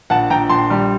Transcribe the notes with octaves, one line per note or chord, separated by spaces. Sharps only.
A#1 F#5 A5
A#1 G5 A#5
A#1 A5 C6
G3